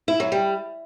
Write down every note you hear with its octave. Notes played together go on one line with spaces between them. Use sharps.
E4
F#3
G3